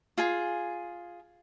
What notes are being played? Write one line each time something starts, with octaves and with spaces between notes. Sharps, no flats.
F4 G#4 G#5